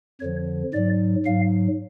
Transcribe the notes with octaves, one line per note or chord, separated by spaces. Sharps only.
F2 D3 F3 C#5
G#2 F#3 D5
G#2 F#3 F5